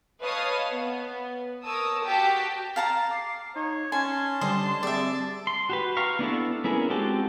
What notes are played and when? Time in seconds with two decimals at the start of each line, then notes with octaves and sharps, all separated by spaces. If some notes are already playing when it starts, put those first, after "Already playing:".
0.22 B4 C#5 D#5 F5 A5 D#6
0.72 B3
1.65 A#4 C#5 A5 D#6 E6
2.04 F#4 G4 G5 A5 B6
2.76 F5 A5 A#5
3.11 D6 C7
3.56 D#4 C#5
3.92 C#4 G#5 A5 C6
4.41 D3 G3 D4 C5 D#5 A5
4.83 G3 C4 G#4 D5 E5
5.47 C6
5.69 F#4 G4 B4
5.97 F5 A#5 C#6
6.19 B3 D4 E4 A4
6.64 B3 C#4 E4 G#4 A#4
6.90 G#3 C4 F#4 G4 A4